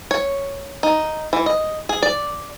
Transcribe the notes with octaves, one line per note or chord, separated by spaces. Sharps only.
C#5
D#4
E3
D#5
G#4
D5